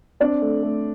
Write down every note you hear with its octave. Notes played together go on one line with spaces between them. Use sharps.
C4 D4 D5
A3
A3